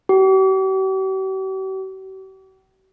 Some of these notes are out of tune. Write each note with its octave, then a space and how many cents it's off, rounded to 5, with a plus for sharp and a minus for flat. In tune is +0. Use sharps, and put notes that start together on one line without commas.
G4 -45